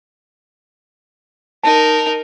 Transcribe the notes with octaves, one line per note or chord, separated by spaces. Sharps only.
D#4 A#4 A5